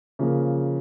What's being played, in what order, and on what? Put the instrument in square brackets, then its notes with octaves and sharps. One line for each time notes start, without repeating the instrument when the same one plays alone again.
[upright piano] C#3 F3 A#3